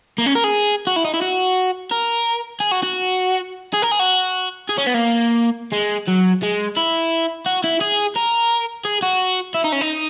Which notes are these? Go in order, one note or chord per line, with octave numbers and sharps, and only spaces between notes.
A#3
C#4
A#4
G#4
F#4
E4
D#4
E4
F#4
A#4
G#4
F#4
F#4
G#4
A#4
G#4
F#4
G#4
C#4
B3
A#3
G#3
F#3
G#3
E4
F#4
E4
G#4
A#4
G#4
F#4
E4
D#4
C#4
D#4